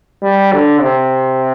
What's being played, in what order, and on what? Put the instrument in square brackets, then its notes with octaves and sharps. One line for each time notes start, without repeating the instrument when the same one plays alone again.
[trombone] G3
D3
C3